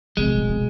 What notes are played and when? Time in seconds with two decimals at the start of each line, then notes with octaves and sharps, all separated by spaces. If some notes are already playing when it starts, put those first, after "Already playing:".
0.17 C3 G#3
0.28 B2
0.38 A#2
0.49 B2